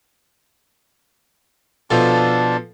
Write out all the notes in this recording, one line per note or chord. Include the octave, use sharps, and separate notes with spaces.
B2 F3 D4 F4 A4 A5